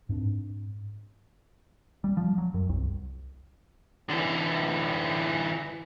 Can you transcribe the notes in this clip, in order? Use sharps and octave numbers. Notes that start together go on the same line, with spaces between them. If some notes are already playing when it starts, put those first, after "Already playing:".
G#2 C4 D4
G3
F3
F#3
F#2
C2
D3 E3